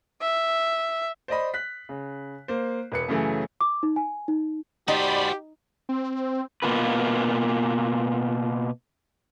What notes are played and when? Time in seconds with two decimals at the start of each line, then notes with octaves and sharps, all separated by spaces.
0.21 E5
1.28 C5 D5 D#5 B5
1.54 F#6 B6
1.89 C#3
2.48 A#3 C5
2.92 E1 B4 C#7
3.08 F#2 C#3 E3 A3
3.61 D6
3.83 D#4
3.96 G#5
4.28 D#4
4.88 D#4 F#4 G4 C5 D5 B5
5.89 C4
6.62 B2 A#3 F4 B4